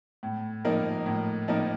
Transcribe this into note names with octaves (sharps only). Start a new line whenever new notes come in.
A2
F3 A#3 D#4 A#4
A2
F3 A#3 D#4 A#4